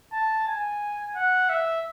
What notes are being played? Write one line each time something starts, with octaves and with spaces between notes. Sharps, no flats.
A5
G#5
F#5
E5